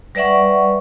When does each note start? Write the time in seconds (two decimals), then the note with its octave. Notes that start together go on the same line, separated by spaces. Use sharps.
0.15 G3 B4 D5 E5 F#5 C#6